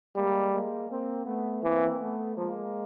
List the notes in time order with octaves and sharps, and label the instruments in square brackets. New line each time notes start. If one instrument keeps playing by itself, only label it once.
[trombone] G3 [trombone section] G#3 A#3
[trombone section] G#3 A#3
A#3 C4
A3 B3
[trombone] E3 [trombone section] A#3 C4
[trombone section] A3 B3
[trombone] F3 [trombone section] G#3 A#3